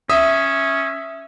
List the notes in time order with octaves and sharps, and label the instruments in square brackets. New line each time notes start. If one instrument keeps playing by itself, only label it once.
[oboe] C#4 [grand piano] E5 [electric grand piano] D#6